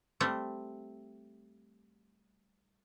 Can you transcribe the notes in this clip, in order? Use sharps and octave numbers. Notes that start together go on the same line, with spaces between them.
G3 A3 C4